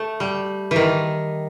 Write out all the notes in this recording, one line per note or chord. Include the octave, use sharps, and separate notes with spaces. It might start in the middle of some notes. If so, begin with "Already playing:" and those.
Already playing: A3
G3
D#3 E3